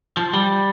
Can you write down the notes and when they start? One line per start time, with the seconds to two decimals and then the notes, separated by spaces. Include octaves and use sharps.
0.17 F3
0.33 G3